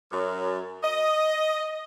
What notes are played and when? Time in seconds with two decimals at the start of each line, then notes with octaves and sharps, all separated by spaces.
0.11 F#2
0.83 D#5